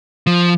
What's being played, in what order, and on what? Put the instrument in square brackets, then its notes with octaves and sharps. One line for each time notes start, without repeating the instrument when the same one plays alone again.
[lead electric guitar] F3